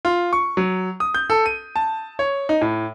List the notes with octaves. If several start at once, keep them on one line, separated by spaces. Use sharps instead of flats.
F4
C#6
F#3
D#6
G6
A4
D#7
A5
C#5
D#4
A2